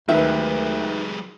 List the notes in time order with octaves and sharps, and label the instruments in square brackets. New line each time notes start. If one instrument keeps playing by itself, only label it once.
[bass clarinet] D2 [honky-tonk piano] D#3 B4 [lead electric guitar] F#3 G#3 [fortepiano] E5